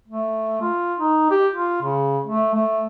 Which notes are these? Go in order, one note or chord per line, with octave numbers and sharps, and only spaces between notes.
A3
F4
D#4
G4
F4
C#3
A3
A3